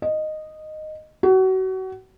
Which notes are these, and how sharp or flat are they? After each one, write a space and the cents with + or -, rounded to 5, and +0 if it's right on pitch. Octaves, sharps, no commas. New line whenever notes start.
D#5 -10
F#4 +30